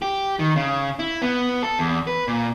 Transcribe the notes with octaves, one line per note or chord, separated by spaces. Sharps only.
G4
D#3
C#3
E4
B3
A4
E2
B4
A#2